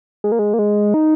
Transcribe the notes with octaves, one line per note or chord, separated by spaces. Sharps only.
G#3
A#3
G#3
A#3
G#3
D#4